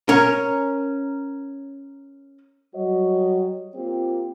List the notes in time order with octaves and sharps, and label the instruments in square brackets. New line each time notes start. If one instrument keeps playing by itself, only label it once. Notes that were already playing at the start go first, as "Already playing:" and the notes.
[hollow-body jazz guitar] C#4 A#4
[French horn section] F#3 G3 F#4 C#5 D#5
A#3 C4 F4 G4